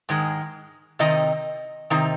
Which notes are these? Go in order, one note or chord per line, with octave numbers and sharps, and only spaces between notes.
G#2 D#3 G#3
C3 D#3 C4 D#4 D#5
C3 D#3 C4 D#4